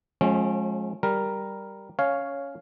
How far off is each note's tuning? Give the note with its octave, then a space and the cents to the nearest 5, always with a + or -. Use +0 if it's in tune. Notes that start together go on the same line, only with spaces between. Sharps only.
F3 +35 G#3 +30 C#4 -30
G3 +0 A#4 +0
C#4 +10 C#5 +0 F5 +0